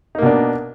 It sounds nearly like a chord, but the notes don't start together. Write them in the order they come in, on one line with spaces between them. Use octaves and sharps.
D#4 A#3 B2 D4